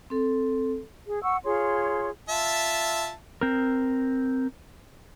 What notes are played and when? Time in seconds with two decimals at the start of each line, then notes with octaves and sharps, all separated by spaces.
0.10 C4 A4
1.06 G#4
1.22 F#5 C#6 E6
1.44 F4 G#4 C#5 C6
2.29 F4 E5 A5
3.41 C4 A#4